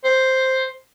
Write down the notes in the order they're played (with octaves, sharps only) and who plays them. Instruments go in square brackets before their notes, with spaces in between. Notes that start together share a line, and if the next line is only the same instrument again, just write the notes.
[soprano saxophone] C5